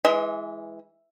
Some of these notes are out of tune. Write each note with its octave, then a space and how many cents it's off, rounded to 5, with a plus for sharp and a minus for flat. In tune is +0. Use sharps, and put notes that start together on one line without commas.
E3 +0 G#3 +0 D#5 +45